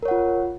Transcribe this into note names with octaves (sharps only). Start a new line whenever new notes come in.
F4 A#4 C#5 F#5